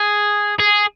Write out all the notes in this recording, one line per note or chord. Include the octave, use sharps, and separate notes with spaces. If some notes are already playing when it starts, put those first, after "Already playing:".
Already playing: G#4
G#4